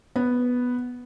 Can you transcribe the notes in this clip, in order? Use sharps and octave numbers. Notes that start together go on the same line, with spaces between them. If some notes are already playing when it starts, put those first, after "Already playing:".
B3